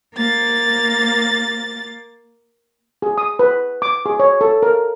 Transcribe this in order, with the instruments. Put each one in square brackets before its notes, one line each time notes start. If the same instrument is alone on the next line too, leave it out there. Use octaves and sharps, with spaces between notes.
[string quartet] A#3 A6
[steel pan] G#4
D#6
B4
D6
G#4
C#5
A4
A#4